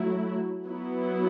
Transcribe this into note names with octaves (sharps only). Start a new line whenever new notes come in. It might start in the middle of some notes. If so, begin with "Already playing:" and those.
Already playing: F#3 A3 E4
F#3 B3 E4